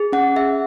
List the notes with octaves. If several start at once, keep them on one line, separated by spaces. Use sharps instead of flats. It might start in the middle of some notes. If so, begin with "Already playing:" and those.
Already playing: G#4
C#4 F#5
G#4 E5